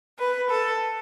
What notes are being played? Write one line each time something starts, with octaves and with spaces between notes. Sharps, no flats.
B4
A4